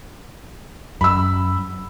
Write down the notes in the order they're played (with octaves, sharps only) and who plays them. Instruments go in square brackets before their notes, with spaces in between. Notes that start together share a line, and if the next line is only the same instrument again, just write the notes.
[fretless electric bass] F#2 [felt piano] B5 E6